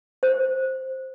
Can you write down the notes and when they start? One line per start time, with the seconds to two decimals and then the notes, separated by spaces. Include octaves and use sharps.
0.23 C5